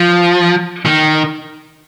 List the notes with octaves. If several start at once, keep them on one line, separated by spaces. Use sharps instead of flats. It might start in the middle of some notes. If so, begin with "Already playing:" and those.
Already playing: F3
D#3